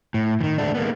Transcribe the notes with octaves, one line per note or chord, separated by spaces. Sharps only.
A2
D#3 E3
G#3 A3 D4
G#3 A#3 B3